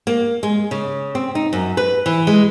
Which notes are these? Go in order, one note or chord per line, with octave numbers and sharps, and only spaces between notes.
A#3
G#3
C#3
C4
D#4
F#2
B4
E3
G#3